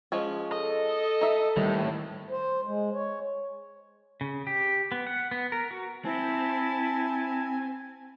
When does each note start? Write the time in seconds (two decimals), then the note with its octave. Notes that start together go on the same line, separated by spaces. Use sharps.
0.12 F3 G#3 C#4
0.52 A4 D#5
1.21 D#4 E5
1.57 A2 D#3 G3
2.30 C5
2.65 G#3
2.93 C#5
4.21 C#3
4.47 G4
4.92 B3
5.07 F#5
5.31 B3
5.52 A#4
5.71 F#4
6.05 C4 E4 G#5 A5